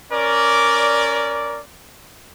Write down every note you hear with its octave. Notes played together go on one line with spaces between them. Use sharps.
C#4 A#4 D5